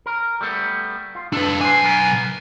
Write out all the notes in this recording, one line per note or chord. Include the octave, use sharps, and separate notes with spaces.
A#4
G3 A3 B3
F4
D4 A4 B4
B1 D4 C5 G#5
B3 A#4